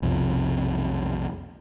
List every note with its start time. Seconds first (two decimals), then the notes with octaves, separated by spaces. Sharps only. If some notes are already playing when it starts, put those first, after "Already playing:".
0.02 B1 F2 C3 F3